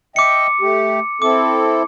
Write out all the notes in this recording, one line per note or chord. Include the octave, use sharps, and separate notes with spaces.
D#5 E5 G5 D6 C#7
A3 G4
C4 E4 A4 D6